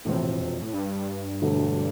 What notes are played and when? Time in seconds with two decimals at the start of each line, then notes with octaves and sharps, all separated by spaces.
0.05 E1 E2 A2 C3 F3 C4
0.40 F2
0.62 A2
0.73 G2
1.42 E1 D2 D3 A3